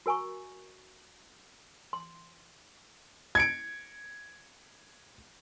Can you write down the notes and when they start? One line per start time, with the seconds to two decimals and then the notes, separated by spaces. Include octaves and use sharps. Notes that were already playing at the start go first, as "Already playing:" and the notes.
0.06 F#4 A#4 G#5 A#5 C#6
1.93 C6
3.35 G#6 C#7 D7